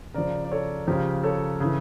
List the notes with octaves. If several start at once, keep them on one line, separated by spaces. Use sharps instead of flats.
C#3 F3 A#4 D5
D5
A4 C#5
C#3 F3 G4 A#4
A4 C#5
C#3 E3